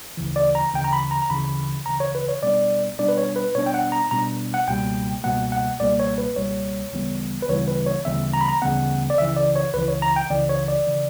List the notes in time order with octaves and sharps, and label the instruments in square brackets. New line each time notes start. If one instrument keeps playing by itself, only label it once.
[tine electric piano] D2 C#3 E3
D5
A#5
D2 C#3 E3 G5
A#5
B5
A#5
A#5
D2 C#3 E3 B5
D2 C#3 E3 A#5
C#5
B4
C#5
B2 G3 B3 D4 D5
B2 G3 B3 D4 D5
B4
C#5
B4
B2 G3 B3 D4 C#5
G5
F#5
A#5
B2 G3 B3 D4 A#5
F#5
C#2 B2 G3 A#3 G5
C#2 B2 G3 A#3 F#5
F#5
C#2 B2 G3 A#3 D5
C#5
B4
C#2 B2 G3 A#3 C#5
D2 C#3 E3 G3 B3
B4
D2 C#3 E3 G3 B3 C#5
B4
C#5
D2 C#3 E3 G3 B3 E5
A#5
B5
A#5
D2 C#3 E3 G3 B3 F#5
D5
C#2 C#3 E3 E5
D5
C#5
C#2 C#3 E3 B4
C#5
A#5
G5
C#2 C#3 E3 D5
C#5
D5
C#3 E3